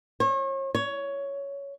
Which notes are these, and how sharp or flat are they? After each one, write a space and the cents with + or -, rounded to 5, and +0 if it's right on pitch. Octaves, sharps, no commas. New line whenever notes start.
C#5 -40
C#5 +10